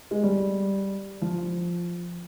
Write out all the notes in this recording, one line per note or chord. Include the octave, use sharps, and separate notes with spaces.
G#3
G3
F3